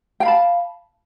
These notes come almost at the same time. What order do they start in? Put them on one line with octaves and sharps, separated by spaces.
G5 F5 B5 A5